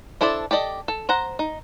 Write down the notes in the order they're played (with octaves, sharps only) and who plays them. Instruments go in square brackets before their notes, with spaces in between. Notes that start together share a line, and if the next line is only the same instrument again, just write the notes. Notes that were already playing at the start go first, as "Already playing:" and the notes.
[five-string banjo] D4 E4 A4 C5 D5
G4 A4 D5 D#5
A4
C5 F#5 A#5
D#4